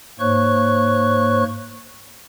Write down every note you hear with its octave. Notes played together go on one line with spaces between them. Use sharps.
G#2 A#3 C5 C#5 C#6 F#6